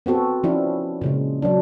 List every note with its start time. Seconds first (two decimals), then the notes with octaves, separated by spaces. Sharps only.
0.06 B3 C4 F#4 A4
0.44 F3 C#4 D4 E4
1.02 A#2 C#3 G#3
1.42 F#3 D4